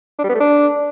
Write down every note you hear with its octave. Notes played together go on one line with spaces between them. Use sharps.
D4
G3
B3
A3
D4